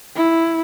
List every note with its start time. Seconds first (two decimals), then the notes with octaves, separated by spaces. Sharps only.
0.16 E4